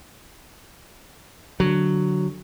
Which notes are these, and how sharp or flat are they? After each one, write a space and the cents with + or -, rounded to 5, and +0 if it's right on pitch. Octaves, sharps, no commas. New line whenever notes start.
D3 +0 F#3 +0